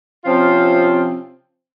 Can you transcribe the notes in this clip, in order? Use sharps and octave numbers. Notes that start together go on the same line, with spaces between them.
C3 F3 C4 C#4 F4